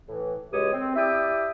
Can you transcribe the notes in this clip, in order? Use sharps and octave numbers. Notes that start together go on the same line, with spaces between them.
A2 E3
C#2 F#2 G#3 G4 C#5 D#6
C4
E4 G4 D5 E5 G5 D#6